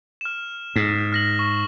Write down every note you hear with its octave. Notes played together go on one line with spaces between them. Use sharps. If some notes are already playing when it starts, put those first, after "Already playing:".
F6 E7
G#2
F6 A#6 F#7
C#6